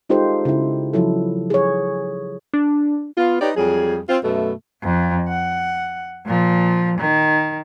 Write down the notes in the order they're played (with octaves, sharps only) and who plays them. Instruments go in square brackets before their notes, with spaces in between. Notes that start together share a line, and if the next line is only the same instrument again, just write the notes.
[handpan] G#3 D#4 F4 G4 A4 C5
C#3 E4
F3 F#3 E4 A4
G#4 C#5
[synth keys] D4
[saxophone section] B3 F4
D#4 G4 B4 C#5 D5
F2 F#3 G3 G#4
C4 F4
F#2 B2 A3
[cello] F2
F#5
A#2 F3
D#3